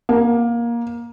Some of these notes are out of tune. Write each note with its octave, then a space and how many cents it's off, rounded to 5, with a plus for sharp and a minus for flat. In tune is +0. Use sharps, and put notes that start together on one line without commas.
A#3 +15